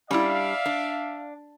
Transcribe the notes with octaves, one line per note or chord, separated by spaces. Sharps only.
G3 C#4 D4 E4 D5 E5 F5
D4